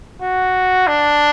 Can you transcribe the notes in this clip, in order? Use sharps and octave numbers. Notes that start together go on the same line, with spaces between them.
F#4
D4